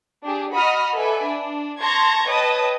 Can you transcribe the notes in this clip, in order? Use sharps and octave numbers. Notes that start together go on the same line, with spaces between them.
D4 G4 G#4
F#4 D#5 A#5 B5 D#6 F6
A4 B4 D5 E5 G#5
D4
A5 A#5 C6 C#6 G#6 A#6
B4 C#5 D#5 G5 A5 D#6